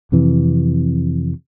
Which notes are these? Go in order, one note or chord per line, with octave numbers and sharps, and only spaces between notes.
F2 C3 E3